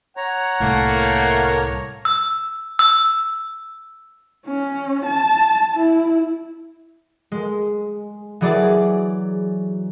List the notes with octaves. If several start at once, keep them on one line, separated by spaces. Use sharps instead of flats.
C#5 F#5 A#5
C2 A2 A3 A#3
E6
E6
C#4
A5
E4
G#3
E3 F#3 G#4 D5 A6